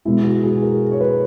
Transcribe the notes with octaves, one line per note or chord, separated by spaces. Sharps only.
B2 G#3 E4
F#4
G#4
A#4
C#5
B4